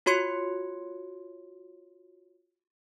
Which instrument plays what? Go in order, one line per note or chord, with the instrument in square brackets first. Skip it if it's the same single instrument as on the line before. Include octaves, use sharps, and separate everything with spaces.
[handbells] F4 F#4 C#5 C6 G#6 C#7